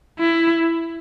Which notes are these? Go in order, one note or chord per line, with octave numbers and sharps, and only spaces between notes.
E4